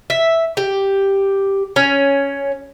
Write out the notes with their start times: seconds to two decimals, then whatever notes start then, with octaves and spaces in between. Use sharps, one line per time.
0.10 E5
0.57 G4
1.76 C#4